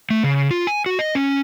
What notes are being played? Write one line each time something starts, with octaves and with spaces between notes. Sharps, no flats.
A3
C#3
F4
G#5
F#4
D#5
C#4